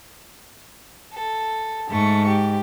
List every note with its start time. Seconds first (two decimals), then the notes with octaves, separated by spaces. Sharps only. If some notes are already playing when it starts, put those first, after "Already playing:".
1.14 A4
1.90 G#2 A3 C#6
2.27 G4